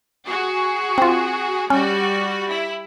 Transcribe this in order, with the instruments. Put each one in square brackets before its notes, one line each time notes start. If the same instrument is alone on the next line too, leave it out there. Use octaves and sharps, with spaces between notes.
[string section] F#4 G#4
[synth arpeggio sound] C4 F4
[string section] G3 F#4 [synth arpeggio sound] C#4
[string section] E4